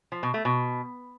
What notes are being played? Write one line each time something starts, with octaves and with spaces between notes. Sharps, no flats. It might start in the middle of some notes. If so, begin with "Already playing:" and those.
F3
B2
A3
B2